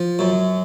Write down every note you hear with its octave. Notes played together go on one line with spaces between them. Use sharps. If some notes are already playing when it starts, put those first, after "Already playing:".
Already playing: F3
F#2